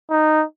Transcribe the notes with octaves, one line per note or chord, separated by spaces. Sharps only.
D#4